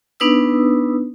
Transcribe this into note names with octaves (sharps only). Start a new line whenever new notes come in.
B3 D4 D#4 B4 D#6 E6